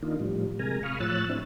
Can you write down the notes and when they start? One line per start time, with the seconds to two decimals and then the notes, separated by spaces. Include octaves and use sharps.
0.03 D#3 A#3 D4 D#4 F4
0.20 A2 F3 G3
0.59 C3 G#3 A#4 G#5 A#5
0.83 F5 B5 C#6 D#6 F6
1.00 A2 F3 C#5 E6 F#6 A6
1.30 C4 D4 E4